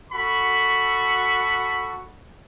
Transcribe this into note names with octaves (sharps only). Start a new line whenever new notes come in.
F#4 A4 B5 C#6